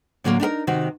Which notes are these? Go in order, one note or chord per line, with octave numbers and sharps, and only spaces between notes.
A2 D3 F#3 G3 A#3
D4 D#4 G4 A#4
C3 D#3 F#4